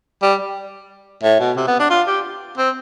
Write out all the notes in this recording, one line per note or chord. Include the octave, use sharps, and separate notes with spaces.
G3
A2
B2
C3
B3
D4
F4
G4
C4